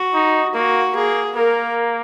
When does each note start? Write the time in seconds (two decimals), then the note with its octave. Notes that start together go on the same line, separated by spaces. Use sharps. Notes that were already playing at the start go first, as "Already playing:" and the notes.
Already playing: F#4
0.14 D#4
0.54 A#3 F#4
0.94 A#3 G#4
1.36 A#3 A#4